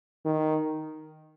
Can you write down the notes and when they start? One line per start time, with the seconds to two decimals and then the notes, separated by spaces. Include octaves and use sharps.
0.25 D#3